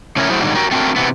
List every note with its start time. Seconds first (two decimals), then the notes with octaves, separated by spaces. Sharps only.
0.16 A2 C#3 C#4 E4 A#4 C#5
0.30 F#3 A3 E4 F#4 G#4 C5
0.42 G#2 D3 D#3 F#3 G3
0.55 F#4 G4 A#4
0.71 A3 C4 D4 F#4 A#4
0.96 C3 E3 B3